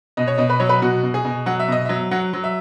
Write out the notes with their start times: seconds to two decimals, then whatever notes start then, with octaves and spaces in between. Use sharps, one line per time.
0.17 B2 D#5
0.27 C#5
0.38 B2 D#5
0.50 B4
0.60 F#3 C#5
0.69 B4
0.82 B2 F#4
1.03 B2
1.14 G#4
1.25 B2
1.46 F#3 F#5
1.59 E5
1.68 B2 D#5
1.85 F#3 E5
2.11 F#3 F#5
2.33 F#3
2.44 E5